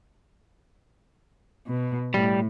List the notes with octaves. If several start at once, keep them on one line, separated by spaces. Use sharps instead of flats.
B2
A2 G3